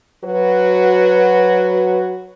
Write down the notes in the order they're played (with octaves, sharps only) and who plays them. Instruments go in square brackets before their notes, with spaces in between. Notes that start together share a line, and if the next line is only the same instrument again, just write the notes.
[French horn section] F#3 F#4 B4